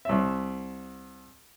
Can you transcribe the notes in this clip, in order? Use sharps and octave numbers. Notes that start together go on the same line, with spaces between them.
C2 E5